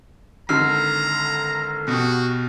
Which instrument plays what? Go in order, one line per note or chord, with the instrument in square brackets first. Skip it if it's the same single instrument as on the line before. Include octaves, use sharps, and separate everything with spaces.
[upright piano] G#1 D3 A4 [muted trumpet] A#5 [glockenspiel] E6 F6 C7
[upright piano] B2 G4 [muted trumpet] F#4